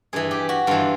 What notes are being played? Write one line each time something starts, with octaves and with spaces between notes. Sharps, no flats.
G2 E3 G#4
G4
F#4
G2 E3 F4